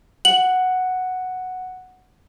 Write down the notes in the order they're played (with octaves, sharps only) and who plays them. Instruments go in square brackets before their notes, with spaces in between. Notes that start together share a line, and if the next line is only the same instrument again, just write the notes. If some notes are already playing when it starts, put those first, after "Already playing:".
[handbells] F#5 [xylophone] F#7